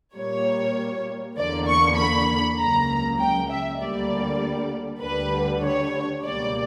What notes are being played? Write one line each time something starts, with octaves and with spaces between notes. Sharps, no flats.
A#2 G3 A#3 C#5
E2 D3 A#3 D5
C#6
B5
C#2 C#3 F#3 A#3 A#5
G5
E5
D2 D3 G3 A#3 D5
D2 D3 G3 B4
C#5
C#2 B2 G3 A#3 D5